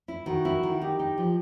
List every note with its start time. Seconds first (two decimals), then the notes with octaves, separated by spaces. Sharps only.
0.08 E4
0.26 D#3 F#4
0.45 E4
0.63 D#3
0.81 D#4 G4
0.99 D#4
1.18 F3